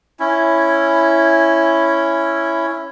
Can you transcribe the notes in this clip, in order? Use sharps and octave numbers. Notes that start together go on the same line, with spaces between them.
C#4 E4